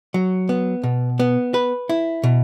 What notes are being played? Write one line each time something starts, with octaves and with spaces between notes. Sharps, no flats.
F#3
B3
B2
B3
B4
E4
B2